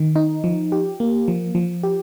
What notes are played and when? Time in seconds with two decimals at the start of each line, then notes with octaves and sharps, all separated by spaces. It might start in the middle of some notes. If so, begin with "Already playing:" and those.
Already playing: D#3
0.16 D#4
0.44 F3
0.72 G4
1.00 A#3
1.28 F3
1.55 F3
1.83 G4